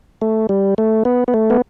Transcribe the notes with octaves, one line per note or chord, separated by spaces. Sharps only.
A3
G3
A3
B3
B3
A3
B3